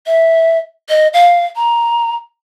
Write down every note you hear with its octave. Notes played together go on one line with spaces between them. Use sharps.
E5
D#5
F5
A#5